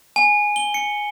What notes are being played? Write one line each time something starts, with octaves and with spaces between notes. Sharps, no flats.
G#5
G7
C#7